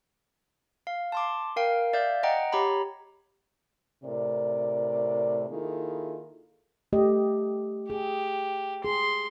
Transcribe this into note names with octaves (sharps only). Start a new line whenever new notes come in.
F5
A5 C6 D6
A#4 F5 G5
D5 E5 F5 G6
D#5 F#5 G5 A#5
G4 C#5 A#5 B5
A2 C3 A#4 D5
D#3 A#3 E4 F4 G#4 A4
A3 G4 D#5
G4 G#4
G#4 C6